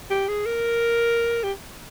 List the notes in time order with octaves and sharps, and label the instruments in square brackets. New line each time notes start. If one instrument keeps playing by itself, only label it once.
[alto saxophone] G4
G#4
A#4
G4